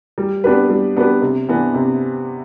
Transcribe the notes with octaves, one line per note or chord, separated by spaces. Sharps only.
G3
B3 D4 G4 B4
G3
B3 D4 G4 B4
C3
E3 B3 D4
C3